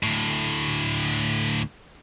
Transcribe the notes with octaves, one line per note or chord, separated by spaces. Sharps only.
D2 A2